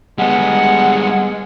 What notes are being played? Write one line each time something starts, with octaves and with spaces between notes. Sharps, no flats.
G3 G#3 B3 F#5